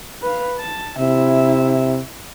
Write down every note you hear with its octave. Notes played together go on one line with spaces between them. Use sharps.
B4 F5
A5
C3 E4 E5